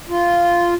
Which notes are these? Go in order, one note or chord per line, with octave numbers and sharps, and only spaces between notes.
F4